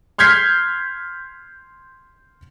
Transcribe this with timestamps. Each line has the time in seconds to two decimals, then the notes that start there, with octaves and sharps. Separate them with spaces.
0.18 C6 F6 G6 G#6 B6 C7